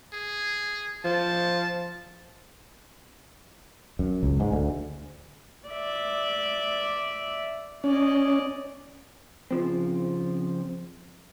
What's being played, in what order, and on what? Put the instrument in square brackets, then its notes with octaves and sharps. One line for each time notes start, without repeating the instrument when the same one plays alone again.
[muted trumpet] G#4
[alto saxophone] F3 [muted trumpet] A5
[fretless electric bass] F#2
C#2
G#2
D2
[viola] D5 E5
[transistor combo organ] C#4 [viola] D5 D#5
[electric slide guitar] C#3 F3 C4